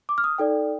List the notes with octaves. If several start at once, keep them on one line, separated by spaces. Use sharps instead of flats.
D6
F6
D#6
D#4 A4 D5 G5